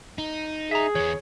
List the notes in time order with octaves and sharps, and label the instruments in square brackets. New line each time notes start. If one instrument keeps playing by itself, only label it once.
[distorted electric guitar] D#4
[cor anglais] G#4 [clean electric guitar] E5 A#5
[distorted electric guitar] E3 B3 [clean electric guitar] C#5